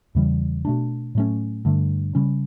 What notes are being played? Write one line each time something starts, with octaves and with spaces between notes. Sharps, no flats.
E2 C#3 E3 G3
B2 A3 D4
A2 F#3 A3 C#4
G2 D3 A3
C#3 G3 C#4